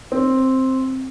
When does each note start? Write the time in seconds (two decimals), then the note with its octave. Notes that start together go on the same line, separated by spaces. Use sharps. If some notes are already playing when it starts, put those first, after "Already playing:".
0.12 C4